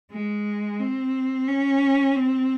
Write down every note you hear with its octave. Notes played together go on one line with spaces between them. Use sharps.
G#3
C4
C#4
C4